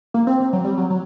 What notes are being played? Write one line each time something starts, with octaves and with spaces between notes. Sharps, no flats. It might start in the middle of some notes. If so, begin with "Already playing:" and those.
A#3
C4
C4
F#3
G3
F#3
F#3